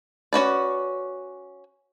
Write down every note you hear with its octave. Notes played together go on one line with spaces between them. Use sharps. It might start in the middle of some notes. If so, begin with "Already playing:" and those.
C#4 F#4 B4 D5